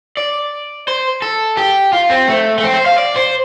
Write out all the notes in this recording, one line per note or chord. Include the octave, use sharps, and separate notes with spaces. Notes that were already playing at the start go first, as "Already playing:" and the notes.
D5
C5
A4
G4
F4
C4
A3
A3
C4
C5
F5
D5
C5